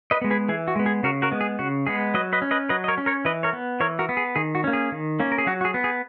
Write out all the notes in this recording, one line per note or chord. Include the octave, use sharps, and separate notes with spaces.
B4 D#5
G#3 B3
G#4 B4
E3 G#4
F#4
G#3 B3
G#4
C#3 F#4 A#4
F#4 A#4
G#3 B3
G#4
C#3 F#4
G#3 B3 G#4
F#3 B4 D#5
B4 D#5
C#4
B4 D#5
F#3 B4 D#5
D#5
A#4 C#5
C#4
A#4 C#5
E3 B4 D#5
A#4 C#5
B3
E3 A#4 C#5
F#4 A#4
B3
G#4
D#3 G#4
F#4
A#3 C#4
G#4
D#3
A#3 C#4
A#4
G#4
F#3 F#4
F#4
G#4
B3
G#4